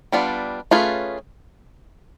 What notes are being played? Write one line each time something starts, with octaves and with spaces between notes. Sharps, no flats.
G3 B3 D4 F4
A3 C#4 F4 G#4 B4